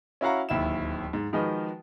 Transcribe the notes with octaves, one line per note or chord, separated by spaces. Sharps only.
C#4 E4 F#4 F5 F#5 A#5
D1 D#2 E4 E7
G#2
D#3 F3 G#3 F#4 B4 D#5